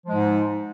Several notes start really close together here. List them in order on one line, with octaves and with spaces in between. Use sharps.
F3 G#3 G#2